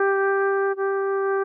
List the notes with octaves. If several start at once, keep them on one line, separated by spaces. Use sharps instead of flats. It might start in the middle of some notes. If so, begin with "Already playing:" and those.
Already playing: G4
G4